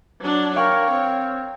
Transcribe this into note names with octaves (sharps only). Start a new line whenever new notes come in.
F#3 D4
A#4 C#5 F5 G5 C#6
C4